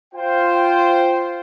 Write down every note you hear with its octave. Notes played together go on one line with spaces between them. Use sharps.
F4 C5 G5